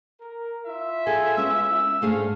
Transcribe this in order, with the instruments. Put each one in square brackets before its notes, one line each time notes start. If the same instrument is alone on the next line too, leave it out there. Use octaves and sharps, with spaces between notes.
[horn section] A#4
E4 F4 E5
[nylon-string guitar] G#4 A4 [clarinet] G#5
[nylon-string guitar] G#3 B3 C#4 [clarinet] E6
[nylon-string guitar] G#2 A3 G#4 [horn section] D4 F5